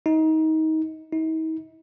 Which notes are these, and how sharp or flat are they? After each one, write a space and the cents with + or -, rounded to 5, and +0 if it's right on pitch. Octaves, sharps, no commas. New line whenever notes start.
D#4 +25
D#4 +45